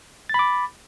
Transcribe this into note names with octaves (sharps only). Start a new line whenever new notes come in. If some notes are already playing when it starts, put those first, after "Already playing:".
B5 D6 A6